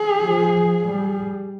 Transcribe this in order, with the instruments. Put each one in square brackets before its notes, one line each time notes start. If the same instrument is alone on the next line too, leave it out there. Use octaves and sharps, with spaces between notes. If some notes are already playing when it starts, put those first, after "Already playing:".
Already playing: [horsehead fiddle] G#4
[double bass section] F3
G3